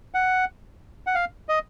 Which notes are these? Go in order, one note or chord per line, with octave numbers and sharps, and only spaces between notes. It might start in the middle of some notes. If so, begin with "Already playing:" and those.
F#5
F#5
F5
D#5